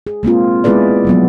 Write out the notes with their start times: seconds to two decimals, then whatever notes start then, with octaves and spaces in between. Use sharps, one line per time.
0.07 G#4
0.23 G#3 A#3 C4 F4
0.64 G#3 B3 E4 G#4 B4 D5
1.05 F3 F#3 B3